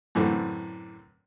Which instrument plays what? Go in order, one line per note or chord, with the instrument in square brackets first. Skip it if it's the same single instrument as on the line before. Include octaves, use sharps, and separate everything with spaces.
[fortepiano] F#2 A2 D3 E3 C4